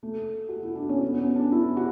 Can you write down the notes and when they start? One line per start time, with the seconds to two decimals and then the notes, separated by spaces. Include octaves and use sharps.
0.03 A3
0.49 F#4
0.63 E4
0.75 D4
0.89 C#4
1.03 B3
1.19 C#4
1.36 D4
1.52 E4
1.77 F#4